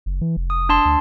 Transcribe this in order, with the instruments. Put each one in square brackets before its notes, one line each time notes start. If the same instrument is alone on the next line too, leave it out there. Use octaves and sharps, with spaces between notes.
[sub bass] F#1
E3
F1
[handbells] D#6
D4 A5 C6
[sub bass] D2